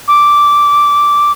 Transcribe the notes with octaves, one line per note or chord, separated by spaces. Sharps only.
D6